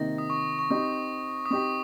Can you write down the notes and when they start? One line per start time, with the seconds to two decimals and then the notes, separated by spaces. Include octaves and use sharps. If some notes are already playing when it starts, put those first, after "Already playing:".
Already playing: C3 D#3 A#3 D#4 A#6
0.18 D#6
0.30 C#6
0.59 C#6
0.70 C4 D#4 G4 D#6
1.46 D#6
1.51 C4 D#4 G4 C#6